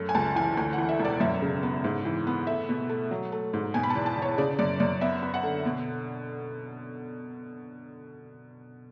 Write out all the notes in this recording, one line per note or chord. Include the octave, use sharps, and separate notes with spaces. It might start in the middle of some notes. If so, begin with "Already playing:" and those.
Already playing: F#2 A3
G#5
C#2 A5
E3 G#5
D2 G#5
F#5
E3
E5
E1 D5
F#2 E5
C#3
B3
G#2
E3
B3
A3 E5
B2
A3
F#3
A3
G#2
B2 G#5
B5
A5
E2
A5
E2
C#5
C#3 D5
F#2 D5
F#2 D5
B3 E5
B3
F#5
D3
B2